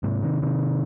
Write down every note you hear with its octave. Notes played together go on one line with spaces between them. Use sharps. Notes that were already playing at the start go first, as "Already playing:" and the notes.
G#2 C3
C3 D#3
C3 D#3